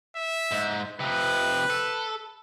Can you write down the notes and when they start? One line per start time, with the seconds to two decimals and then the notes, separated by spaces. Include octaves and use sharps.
0.16 E5
0.51 G#2
1.00 C3 F3 B4
1.70 A4